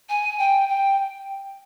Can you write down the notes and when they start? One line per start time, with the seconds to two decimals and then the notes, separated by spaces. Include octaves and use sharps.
0.09 G#5
0.39 G5
0.69 G5